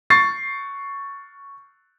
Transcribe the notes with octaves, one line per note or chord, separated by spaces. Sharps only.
C#6 A6 C7